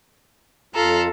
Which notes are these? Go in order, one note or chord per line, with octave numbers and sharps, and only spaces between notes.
F2 F4 A4 F5 A#5